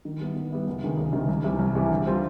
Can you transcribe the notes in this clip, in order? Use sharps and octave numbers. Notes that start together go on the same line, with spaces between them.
D#3
G3 B3 E4
D#3
G3 B3 E4
C#2
C3 D#3 G#3
C#2
C3 D#3 G#3
C2
C3 E3 G3
C2
C3 E3 G3
D3
G3 C4 F4